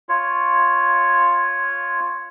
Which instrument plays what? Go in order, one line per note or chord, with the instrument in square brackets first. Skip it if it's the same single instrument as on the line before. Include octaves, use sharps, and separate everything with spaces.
[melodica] F4 C#5